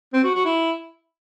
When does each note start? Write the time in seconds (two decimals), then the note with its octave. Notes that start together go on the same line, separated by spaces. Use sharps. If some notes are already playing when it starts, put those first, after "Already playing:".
0.13 C4
0.24 F#4
0.34 F#4
0.45 E4